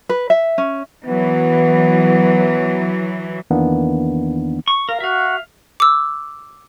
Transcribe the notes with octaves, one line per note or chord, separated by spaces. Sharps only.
B4
E5
C#4
E3 F#3 B3
E2 D#3 E3 A#3 B3 D4
C#6
A#4 F5
F#4 E5 F5
D6 E6